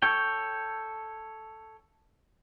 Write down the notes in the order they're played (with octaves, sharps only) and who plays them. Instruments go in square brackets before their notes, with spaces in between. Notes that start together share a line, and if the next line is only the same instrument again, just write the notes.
[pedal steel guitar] A4 C#5 G5